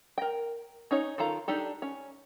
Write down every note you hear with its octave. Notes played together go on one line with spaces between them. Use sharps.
A#4 G5
C#4 D#4 C#5
D#3 F4 A4 F5 A#5
D4 D#4 G4 A4
C#4